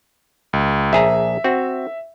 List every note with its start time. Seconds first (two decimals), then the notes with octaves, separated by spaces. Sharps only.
0.53 C#2
0.93 A#1 G#4 E5 A#5
1.44 C4 F#4